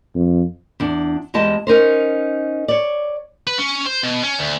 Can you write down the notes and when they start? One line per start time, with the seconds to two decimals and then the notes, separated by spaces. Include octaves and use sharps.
0.15 F2
0.80 E2 D4
1.34 E2 G3 G#3 D#5 A5
1.67 C#4 D#4 A#4 C5
2.68 C#5 D5
3.47 B4
3.58 C#4
3.86 C5
4.03 B2
4.23 C#4
4.39 D2